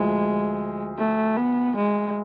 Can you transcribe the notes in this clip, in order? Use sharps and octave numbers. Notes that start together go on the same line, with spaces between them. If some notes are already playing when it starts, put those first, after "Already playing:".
Already playing: D2 F3 G#3
A3
B3
G#3